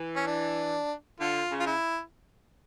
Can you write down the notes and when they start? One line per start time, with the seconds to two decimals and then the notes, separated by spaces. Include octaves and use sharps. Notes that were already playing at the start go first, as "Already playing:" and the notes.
Already playing: E3
0.16 C#4
0.27 D4
1.20 D3 F4
1.51 C#3
1.60 F4
1.67 E4